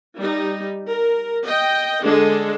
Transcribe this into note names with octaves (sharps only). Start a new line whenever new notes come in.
G3 D#4
A#4
D#5 G5
D3 G#3 D4 A4